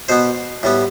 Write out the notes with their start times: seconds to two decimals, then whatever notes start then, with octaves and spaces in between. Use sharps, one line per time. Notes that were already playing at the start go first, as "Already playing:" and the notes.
0.09 B2 B3 C5
0.63 A2 G3 B3